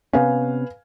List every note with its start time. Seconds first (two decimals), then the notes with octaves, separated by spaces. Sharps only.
0.13 C3 B3 C#4 B4 F5 G#5